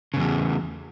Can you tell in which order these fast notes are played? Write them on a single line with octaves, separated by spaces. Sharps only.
C#3 G#2 E2